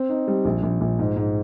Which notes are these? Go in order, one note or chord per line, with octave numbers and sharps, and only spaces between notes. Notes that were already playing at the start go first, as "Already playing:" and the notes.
Already playing: C4
D#4
G3
A#1
A#1
A#1
G#2
G#2